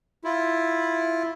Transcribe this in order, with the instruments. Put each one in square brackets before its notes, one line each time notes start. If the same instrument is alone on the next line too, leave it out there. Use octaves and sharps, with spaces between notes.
[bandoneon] E4 F4